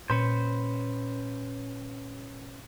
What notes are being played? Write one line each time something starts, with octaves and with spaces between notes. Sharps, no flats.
A#2 C#4 B4 C5